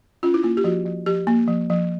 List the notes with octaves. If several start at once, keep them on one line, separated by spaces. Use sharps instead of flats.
C#4 F4
E4
A#3 F4
G4
F3 F#4
F3
F3 G4
A#3
F3
F3